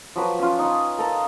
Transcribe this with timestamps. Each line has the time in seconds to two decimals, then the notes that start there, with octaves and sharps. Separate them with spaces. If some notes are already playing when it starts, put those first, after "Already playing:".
0.16 F3 F#3 B4 D6
0.39 C#4 F4
0.59 D#4 F5 G#5
0.98 A4 A#4 A#5